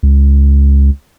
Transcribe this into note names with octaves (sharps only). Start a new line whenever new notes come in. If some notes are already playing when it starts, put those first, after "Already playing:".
C#2